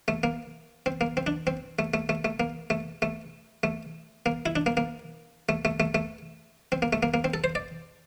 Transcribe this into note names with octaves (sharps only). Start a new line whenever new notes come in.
A3
A#3
C4
A#3
C4
D4
C4
A3
A3
A3
A3
A#3
A3
A3
A3
A#3
E4
D4
A#3
A#3
A3
A3
A3
A3
C4
A#3
A3
A#3
A#3
C4
A4
C5
D5